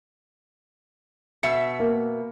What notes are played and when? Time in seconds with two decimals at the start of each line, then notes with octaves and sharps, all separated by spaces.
1.43 B2 E5 C#7
1.80 A#3